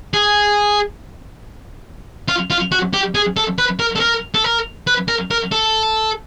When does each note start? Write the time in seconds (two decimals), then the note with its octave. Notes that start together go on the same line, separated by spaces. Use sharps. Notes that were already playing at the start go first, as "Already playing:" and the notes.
0.14 G#4
2.28 F4
2.50 F4
2.72 F#4
2.94 G4
3.15 G#4
3.37 A4
3.58 B4
3.79 A#4
3.96 A4
4.00 A#4
4.34 A4
4.44 A#4
4.87 B4
5.08 A#4
5.31 A#4
5.52 A4